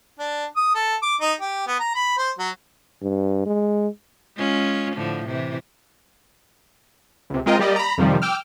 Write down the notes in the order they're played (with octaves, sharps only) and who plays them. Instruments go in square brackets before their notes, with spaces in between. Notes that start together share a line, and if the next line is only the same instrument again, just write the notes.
[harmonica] D4
D#6
A4
D6
D#4
G4
B3
A#5
B5
C5
F#3
[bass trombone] G2
G#3
[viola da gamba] G#3 C#4 F4
A2 D3 F3
C3 E3
[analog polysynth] C#2 C3
G#3 C4 F4 A#4 D#5 G5
G3 A#3 G4 D5 D#5
A#5 B5
F2 C3 D#3 F3 G3
G5 D6 E6 F6